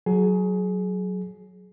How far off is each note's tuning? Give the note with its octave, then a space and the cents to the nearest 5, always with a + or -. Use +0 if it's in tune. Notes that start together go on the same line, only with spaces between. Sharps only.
F#3 +0 G#4 +25